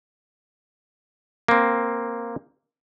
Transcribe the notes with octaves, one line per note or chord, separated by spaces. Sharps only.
A#3 C4